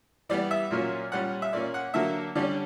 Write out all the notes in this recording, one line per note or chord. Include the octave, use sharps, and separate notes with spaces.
E3 G3 B3 D5
E5
A#2 F#3 A#3 C#4
A#2 G3 C#4 F#5
E5
A#2 A#3 C#4 D5
F#5
D3 F#3 A#3 E5
D3 G3 C#4 D5